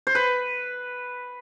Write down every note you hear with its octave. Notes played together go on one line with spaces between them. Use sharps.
C5
B4